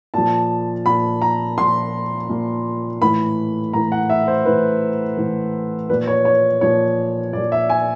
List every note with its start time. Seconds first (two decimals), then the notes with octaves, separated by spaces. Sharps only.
0.14 A#2 F3 A5
0.86 A#2 F3 B5
1.22 A#5
1.58 A#2 F3 C6
2.29 A#2 F3
3.02 A2 E3 B5
3.73 A2 E3 A#5
3.92 F#5
4.10 E5
4.28 C5
4.45 A2 E3 B4
5.17 A2 E3
5.89 A#2 F3 B4
6.07 C#5
6.25 C#5
6.61 A#2 F3 C#5
7.33 A#2 F3 D5
7.52 E5
7.70 G#5